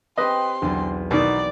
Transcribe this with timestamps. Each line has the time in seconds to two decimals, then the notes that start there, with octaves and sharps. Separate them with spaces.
0.18 C4 G4 B4 D#5 C6
0.62 B1 E2 D3
1.11 B2 D#3 B3 D#4 E4 D5